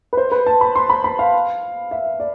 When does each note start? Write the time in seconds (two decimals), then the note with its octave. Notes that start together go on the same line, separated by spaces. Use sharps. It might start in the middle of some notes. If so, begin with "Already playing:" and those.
0.13 B4
0.17 C5
0.32 B4
0.46 A5
0.61 B5
0.75 C6
0.90 B5
1.04 B5
1.19 F5
1.91 E5
2.20 D5